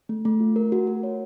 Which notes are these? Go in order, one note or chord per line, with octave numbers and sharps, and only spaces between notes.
A3
A3
F4
A#4
F#4
F#4
C#5